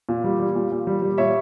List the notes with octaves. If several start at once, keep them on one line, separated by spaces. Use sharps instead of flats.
A#2
G3
G3
A#2
A#2
G3
G3
A#2 C#5 E5